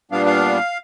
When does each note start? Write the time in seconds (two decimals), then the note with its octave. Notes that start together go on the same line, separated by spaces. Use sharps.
0.11 A#2 G3 B3 D4 F5
0.26 F5